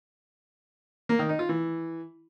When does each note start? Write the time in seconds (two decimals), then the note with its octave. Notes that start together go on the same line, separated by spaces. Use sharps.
1.09 A#3
1.19 D#3
1.29 D#4
1.39 F4
1.49 E3